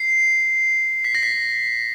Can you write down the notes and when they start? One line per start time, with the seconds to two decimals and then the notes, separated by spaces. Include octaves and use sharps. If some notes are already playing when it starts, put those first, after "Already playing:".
Already playing: C7
1.05 B6
1.15 A#6
1.23 B6